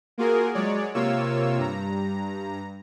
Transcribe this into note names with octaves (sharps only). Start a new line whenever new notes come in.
A#3 F4 F#4 G#4 A#4
F#3 G#3 C#5 D5
C3 A#3 F4 C#5 E6
G2 A#5